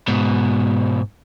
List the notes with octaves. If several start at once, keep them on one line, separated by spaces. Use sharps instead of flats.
G#2 B2